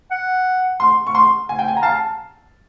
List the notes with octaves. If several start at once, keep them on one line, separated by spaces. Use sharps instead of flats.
F#5
C6
C#6
C6
G#5
G5
G#5
A#5
F5 A5